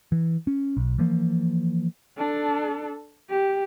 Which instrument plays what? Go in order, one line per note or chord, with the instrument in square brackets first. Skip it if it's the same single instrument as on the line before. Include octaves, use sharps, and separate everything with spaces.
[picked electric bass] E3
C#4
B1
E3 F3 A#3
[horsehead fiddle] D4 A4
G4